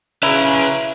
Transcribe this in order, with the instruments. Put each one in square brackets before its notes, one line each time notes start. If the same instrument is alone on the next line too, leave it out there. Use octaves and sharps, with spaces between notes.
[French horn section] C#3 [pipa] E4 [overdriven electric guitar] B4 A#5